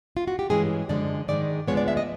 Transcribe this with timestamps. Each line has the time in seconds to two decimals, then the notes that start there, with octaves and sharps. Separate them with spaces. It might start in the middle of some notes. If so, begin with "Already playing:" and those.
0.17 F4
0.28 F#4
0.39 G4
0.50 G2 E3 G#3 C#4 G#4
0.89 F#2 D3 F3 G#3 D5
1.28 G#2 D#3 G#3 D5
1.68 D2 D3 F3 G#3 B3 C#5
1.77 D5
1.88 E5
1.97 D#5